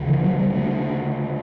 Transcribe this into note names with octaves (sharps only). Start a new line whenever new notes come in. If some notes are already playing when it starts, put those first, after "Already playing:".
Already playing: D2 C#3
E3
F#3
G3
A3